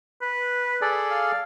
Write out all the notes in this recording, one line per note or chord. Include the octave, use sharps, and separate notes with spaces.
B4
G#4 A4 D5
F5